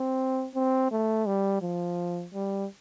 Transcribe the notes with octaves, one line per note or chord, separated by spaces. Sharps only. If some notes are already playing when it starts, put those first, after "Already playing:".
Already playing: C4
C4
A3
G3
F3
G3